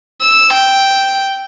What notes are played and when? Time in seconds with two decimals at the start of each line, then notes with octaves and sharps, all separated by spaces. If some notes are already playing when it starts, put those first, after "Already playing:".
0.21 E6
0.54 G5